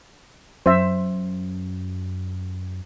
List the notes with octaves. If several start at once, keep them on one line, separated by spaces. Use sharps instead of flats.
F#2 C5 E5